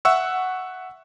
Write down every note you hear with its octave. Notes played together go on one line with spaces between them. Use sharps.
E5 F#5 C#6 E6